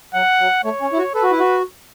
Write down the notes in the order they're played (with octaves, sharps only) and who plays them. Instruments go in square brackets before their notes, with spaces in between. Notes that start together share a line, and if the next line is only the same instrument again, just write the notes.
[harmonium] F#3 [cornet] F#5
[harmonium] F#3
[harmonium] A3 [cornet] C#5
[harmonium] C#4
E4
F#4
[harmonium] A4 [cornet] B4
[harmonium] F#4
E4
F#4